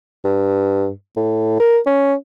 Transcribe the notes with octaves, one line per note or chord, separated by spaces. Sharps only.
G2
A2
A#4
C#4